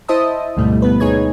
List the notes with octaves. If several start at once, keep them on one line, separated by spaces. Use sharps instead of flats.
E4 C5 D#5 E5 A5 D#6
D2 G#2 B2 G3 A3
B3 B4
D2 G#2 D#4 G#4 C#5 G#6